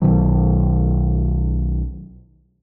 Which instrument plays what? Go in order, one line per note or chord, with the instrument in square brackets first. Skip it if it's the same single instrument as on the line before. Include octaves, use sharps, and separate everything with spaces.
[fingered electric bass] B1 B2 D#3 F#3